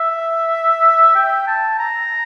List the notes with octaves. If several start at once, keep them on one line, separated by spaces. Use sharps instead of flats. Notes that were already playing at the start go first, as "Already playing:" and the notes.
Already playing: E5
G5
A5
A#5